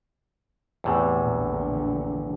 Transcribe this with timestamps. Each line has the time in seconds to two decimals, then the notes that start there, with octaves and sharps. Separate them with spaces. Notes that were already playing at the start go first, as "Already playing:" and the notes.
0.84 E2 A2 C3
1.17 A#1 A#2 D3